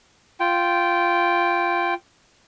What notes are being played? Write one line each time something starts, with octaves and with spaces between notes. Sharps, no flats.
F4 G5